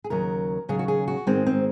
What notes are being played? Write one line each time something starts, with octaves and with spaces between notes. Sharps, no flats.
G#4
D#2 C#3 F#3 A#4
D#2 C#3 F#3 G#4
F#4
G#4
F#4
G#2 D#3 G#3 C4
C4